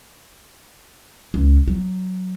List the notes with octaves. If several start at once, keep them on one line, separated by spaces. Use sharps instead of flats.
C#2
F#3